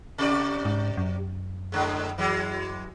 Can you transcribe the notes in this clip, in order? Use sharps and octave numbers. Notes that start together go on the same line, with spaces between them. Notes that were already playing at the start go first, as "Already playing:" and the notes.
C3 G4 D5
G#2
F#2
G#2 D3 G#3
E3 F#3 G#3